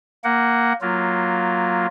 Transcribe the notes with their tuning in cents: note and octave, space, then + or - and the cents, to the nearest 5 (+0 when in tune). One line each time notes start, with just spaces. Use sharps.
A#3 +0 F#5 +15
F#3 +0 A#3 +0 F4 +0